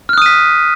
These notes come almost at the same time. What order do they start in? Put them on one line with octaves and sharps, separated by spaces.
F6 F#6 D#6 D#7 B6